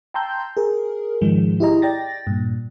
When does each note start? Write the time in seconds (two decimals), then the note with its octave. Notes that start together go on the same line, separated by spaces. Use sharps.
0.14 G5 A5 A#5 C6 E6 G6
0.57 G#4 A#4
1.21 G#2 D#3 F3 G#3
1.60 E4 G4 G#4 D#5 A#5
1.82 D5 G5 A6 A#6
2.27 G2 A#2